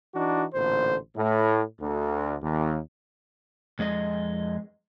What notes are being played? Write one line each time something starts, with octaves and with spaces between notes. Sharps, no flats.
E3 D4 D#4 F#4
A1 A#2 D3 C5
A2
D2
D#2
F2 G#3 G#4 D#5